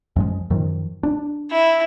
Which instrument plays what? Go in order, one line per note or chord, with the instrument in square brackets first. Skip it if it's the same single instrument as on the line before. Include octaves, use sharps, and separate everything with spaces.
[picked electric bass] F#2 F3 G#3
F#2 D#3 F3
D4
[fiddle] E4